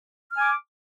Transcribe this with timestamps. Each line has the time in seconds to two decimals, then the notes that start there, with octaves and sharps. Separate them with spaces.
0.32 F6
0.37 G#5
0.41 D6